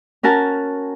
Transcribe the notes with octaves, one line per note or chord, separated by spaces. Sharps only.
C#4 F#4 A#4 A5